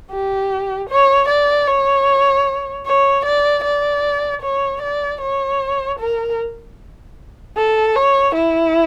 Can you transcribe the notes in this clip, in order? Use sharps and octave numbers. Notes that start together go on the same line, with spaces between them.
G4
C#5
D5
C#5
C#5
D5
D5
C#5
D5
C#5
A#4
A4
C#5
E4